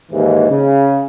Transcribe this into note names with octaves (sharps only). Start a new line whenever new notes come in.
D#2 G#2 E3
C#3